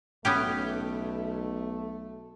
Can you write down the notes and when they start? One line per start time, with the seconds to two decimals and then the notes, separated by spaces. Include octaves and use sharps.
0.25 B1 A3 B3 C#4 G4